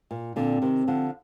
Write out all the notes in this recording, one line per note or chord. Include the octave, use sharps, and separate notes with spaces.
A#2
A#2 D3 C4
C3 D#3
D3 F3